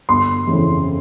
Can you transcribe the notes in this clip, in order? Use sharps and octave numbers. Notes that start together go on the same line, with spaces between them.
G1 C6
F2 C#3 E3